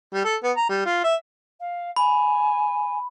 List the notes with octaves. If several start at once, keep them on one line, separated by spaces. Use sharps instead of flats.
G3
A4
B3
A#5
G3
F4
E5
F5
G#5 B5